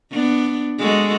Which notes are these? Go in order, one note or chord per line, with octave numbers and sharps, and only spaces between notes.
B3 D4
G#3 F#4 A4